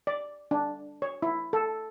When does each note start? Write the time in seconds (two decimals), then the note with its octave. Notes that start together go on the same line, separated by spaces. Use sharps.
0.07 D5
0.51 D4
1.02 C#5
1.22 E4
1.53 A4